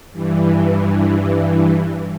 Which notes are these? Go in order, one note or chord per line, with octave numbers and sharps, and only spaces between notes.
G2 E3